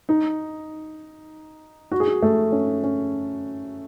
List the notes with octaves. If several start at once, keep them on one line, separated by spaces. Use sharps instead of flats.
D#4
F#4
G#4
F#4
A3
C#4
C#4